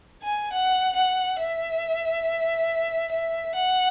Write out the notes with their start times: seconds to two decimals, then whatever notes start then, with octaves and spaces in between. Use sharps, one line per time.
0.23 G#5
0.52 F#5
0.95 F#5
1.39 E5
3.11 E5
3.55 F#5